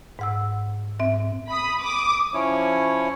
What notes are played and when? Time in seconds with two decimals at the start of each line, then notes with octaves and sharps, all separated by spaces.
0.19 G#2 F#5 E6
1.00 G#2 C4 E5
1.49 B5 D#6
1.82 D6 D#6
2.34 F3 C#4 E4 C#5